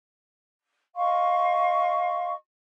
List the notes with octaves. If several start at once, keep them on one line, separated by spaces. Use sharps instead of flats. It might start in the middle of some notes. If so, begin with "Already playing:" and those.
D#5 F5 C6 C#6